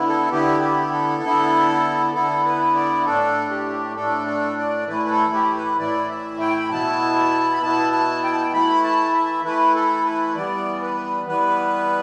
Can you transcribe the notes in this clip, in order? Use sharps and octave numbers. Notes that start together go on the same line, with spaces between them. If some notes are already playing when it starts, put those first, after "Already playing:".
Already playing: D3 B3 E4
A4
D3 B3 E4 G4
G4
A4
D3 B3 E4
D3 B3 E4 A4
B4
D5
A2 A3 D4 A4
G4
A2 A3 D4 A4
A4
D5
A2 E3 A3 E4 B4
B4
A4
G4
B4
A2 E3 A3 E4 D5
E5
G5
B5
B2 B3 E4 A5
B5
B2 B3 E4 A5
A5
G5
A5
G5
E3 A3 E4 B5
A5
E5
E3 A3 E4 B4
A4
B4
E3 G3 B3 D5
B4
E3 G3 B3 B4